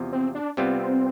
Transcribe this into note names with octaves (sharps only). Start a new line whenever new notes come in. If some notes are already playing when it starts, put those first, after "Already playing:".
Already playing: E2 C3 F3
C4
D4
C3 G3 B3 C4 F4